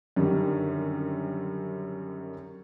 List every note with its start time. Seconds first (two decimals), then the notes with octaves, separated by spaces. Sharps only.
0.16 F#2 D3 D#3 G3